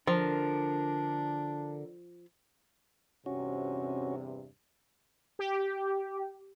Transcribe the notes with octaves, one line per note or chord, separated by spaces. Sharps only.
D3 F3 D4 A#4
E2 G2 C3 C#4 F#4
G4